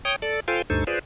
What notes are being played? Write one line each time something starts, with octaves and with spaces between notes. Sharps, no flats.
C#5 G5 D#6
A4 D5
F4 A4 C5 F5 G5 G#5
D2 G2 D#4 A4 C5 C#6
F4 G#4 B4 C5 D5